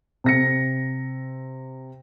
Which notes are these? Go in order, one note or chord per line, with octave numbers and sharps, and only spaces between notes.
C3 A#6 C#7